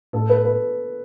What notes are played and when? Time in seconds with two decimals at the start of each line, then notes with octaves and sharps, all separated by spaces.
0.13 A2 A4
0.29 B4
0.45 B4